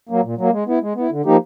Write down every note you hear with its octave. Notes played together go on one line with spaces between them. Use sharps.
F#3 A#3
A#2
F#3 A#3
G#3
B3 E4
G#3
B3 E4
D3
F3 A#3 D#4 G4